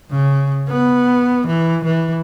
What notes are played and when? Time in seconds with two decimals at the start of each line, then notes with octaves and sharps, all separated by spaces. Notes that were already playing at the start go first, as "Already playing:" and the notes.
0.11 C#3
0.69 B3
1.47 E3
1.85 E3